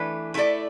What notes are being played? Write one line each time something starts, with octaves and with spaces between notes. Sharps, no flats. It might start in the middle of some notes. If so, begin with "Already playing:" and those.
Already playing: E3 A3 D4 B4
A3 E4 A4 D5